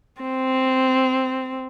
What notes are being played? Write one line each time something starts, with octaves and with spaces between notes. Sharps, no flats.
C4